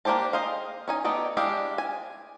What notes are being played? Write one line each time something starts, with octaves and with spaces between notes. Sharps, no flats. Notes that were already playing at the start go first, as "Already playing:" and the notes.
A#3 D4 G4 C5 A5
G#4 C5 D#5 F5
C#4 D#4 G#5
D#3 A3 B3 D#4 D5
G#3 D4 E4 G4 F5
G#5